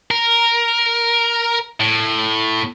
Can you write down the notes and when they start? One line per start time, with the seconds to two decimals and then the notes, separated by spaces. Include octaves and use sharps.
0.11 A#4
1.80 A2